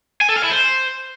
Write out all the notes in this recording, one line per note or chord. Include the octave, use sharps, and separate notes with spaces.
G#5
A4
F5
E4
C5